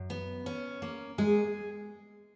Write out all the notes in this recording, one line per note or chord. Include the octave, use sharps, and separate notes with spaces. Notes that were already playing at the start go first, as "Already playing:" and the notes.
Already playing: F#2
B3
C#4
A#3
G#3 G#4